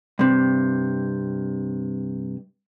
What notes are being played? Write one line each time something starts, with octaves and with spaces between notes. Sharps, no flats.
G2 C3